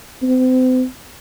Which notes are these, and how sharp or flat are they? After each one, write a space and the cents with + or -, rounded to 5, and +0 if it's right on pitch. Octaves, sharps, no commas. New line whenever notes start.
C4 -40